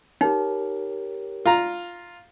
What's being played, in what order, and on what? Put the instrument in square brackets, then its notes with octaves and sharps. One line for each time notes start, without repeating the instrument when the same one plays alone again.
[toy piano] D#4 [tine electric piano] G4 A#4 C#5
[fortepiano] F4 A#5